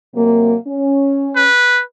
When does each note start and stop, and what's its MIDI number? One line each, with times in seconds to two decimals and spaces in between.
0.15 0.55 48
0.15 0.55 54
0.15 0.55 58
0.67 1.48 61
1.36 1.82 71